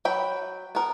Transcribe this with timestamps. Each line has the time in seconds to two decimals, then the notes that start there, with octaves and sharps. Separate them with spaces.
0.05 F#3 G5 B5
0.75 B3 A#4